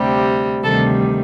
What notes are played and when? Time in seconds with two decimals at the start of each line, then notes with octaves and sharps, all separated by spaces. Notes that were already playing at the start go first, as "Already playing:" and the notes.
Already playing: D2 C3 G3
0.63 D2 C3 D#3 G3 A4